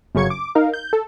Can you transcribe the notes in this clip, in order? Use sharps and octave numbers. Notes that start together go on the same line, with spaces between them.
G1 F#2 C#3 C#6 G#6 C#7
D6
D#4 A#4 F5
G6
A4